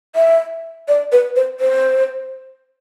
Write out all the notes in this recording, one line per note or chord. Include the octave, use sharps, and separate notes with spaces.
E5
D5
B4
C5
C5